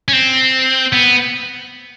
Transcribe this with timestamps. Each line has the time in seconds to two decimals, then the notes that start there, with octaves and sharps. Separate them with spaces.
0.08 C#4
0.13 C4
0.93 B3